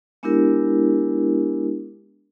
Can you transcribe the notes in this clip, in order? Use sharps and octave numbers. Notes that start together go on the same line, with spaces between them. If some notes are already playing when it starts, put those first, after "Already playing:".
G#3 B3 D4 E4 G4 A#4